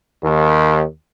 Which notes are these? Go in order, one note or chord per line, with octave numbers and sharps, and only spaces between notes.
D#2